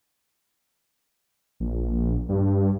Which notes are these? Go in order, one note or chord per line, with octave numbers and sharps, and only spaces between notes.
A#1
G2